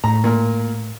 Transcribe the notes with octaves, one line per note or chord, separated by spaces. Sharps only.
A2 A#5
A#2 A#4